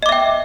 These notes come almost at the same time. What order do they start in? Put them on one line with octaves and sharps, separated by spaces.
D#5 D6 E5 G5